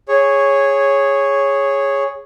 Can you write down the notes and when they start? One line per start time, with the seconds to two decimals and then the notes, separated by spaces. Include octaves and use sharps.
0.08 G#4 C#5